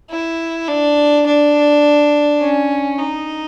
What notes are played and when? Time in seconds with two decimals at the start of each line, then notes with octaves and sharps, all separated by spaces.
0.10 E4
0.68 D4
1.26 D4
2.41 C#4
2.99 D#4